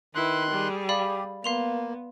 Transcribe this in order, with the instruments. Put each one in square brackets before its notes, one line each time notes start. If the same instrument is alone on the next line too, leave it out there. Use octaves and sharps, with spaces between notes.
[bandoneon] D#3 C6 F#6 [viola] E4 B4
[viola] G3 G#4
[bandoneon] G4 [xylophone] D5 F5 B5
[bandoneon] A#3 [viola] B3 [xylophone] F5 C6 F7